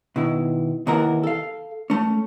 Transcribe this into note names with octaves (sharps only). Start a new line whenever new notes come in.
B2 D#3 E4
D#2 C3 E3 A#4 F#5
A4 F5
A3 C#4